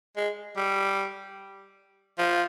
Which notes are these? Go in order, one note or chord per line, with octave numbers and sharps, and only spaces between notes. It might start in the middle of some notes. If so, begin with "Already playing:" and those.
G#3
G3
F3